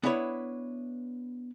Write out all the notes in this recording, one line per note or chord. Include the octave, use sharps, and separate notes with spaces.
B3 D4 E4 B4 C#5